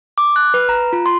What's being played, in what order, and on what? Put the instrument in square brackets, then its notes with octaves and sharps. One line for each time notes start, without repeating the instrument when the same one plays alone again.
[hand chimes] D6
F#6
B4
A#5
F4
C6